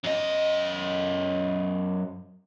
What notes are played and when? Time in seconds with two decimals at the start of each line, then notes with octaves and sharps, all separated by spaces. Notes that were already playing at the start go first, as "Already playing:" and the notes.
0.04 F#2 D#5